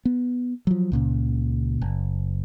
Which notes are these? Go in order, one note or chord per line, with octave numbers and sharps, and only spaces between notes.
B3
F3 F#3
C#2 A#2 C#3
F#1